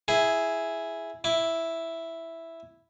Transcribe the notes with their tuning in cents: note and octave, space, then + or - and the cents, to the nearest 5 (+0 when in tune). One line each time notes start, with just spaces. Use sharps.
E4 +0 G#4 +0
E4 +0 D6 -15